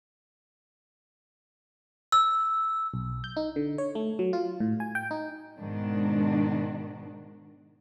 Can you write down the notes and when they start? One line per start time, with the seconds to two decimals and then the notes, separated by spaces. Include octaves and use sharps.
2.12 E6
2.94 B1
3.24 G6
3.37 D#4
3.56 D3
3.78 C#5
3.95 A3
4.19 F#3
4.33 F4
4.60 A2
4.80 G#5
4.95 G5
5.11 D#4
5.59 G#2 B2 D#3 D4